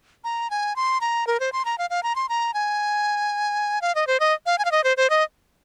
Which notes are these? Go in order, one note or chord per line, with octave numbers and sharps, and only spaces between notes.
A#5
G#5
C6
A#5
A#4
C5
C6
A#5
F5
F5
A#5
C6
A#5
G#5
F5
D#5
C5
D#5
F5
G#5
F5
D#5
C5
C5
D#5